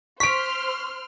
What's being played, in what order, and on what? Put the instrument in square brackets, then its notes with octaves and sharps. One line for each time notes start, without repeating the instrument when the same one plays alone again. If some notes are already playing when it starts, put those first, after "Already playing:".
[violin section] C5 C6 F6 [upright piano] C#6 D7 [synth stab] B6